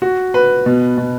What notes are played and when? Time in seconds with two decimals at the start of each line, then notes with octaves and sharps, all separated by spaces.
0.02 F#4
0.34 B4
0.66 B2
0.98 B2